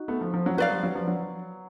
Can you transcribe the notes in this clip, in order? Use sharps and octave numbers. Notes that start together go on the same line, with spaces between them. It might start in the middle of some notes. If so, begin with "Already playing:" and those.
Already playing: D#4 F#4
A3 B3
F3
F3
F#3
F#3 B4 D5 F5
F3 G3
F#3
F3
F#3